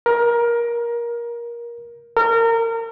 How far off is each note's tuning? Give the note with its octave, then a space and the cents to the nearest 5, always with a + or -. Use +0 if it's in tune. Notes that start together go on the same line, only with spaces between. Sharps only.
A#4 +20
A#4 -30